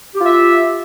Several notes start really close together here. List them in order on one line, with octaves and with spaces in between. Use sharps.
G4 F4 E5